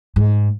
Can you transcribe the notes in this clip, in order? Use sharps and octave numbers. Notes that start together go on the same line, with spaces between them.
G#2